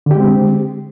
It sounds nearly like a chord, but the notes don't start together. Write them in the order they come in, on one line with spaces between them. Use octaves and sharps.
D3 G4 G#3 C4